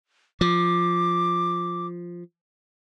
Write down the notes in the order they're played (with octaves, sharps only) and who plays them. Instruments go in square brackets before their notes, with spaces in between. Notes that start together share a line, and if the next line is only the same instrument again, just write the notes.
[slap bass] F3 [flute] D6